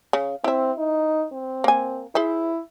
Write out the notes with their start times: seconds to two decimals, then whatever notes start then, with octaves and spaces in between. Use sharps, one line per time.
0.13 C#3
0.44 C4 E4 E5
0.77 D#4
1.32 C4
1.64 A#3 G#5
2.15 E4 G#4 C5 E5